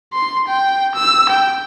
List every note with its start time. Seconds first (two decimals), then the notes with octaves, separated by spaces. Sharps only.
0.13 C6
0.49 G5
0.95 E6
1.30 G5